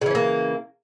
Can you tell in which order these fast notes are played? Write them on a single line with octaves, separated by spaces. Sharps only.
C#3 E3 C#4 A#3